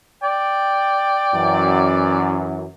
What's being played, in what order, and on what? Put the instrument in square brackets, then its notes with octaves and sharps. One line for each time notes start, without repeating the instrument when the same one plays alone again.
[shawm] D5 [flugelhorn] G5
[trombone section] F#2 E3